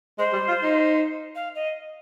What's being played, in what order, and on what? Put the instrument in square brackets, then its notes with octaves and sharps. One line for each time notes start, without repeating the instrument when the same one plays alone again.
[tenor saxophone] G#3 [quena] C5
[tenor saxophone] G3
F4
D#4
[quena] F5
D#5